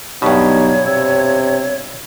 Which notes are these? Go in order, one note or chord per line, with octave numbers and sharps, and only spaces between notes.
G2 B2 F#3 B3 D#4 G4 C#5
C3 E6